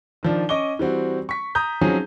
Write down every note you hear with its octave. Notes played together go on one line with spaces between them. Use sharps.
D#3 F3 D4
C#4 D#5 C#6 D6 G7
E3 G3 C4 F#4
C#6 B6
A#5 D#6 G6
F3 F#3 C4 C#4 D#4 G#4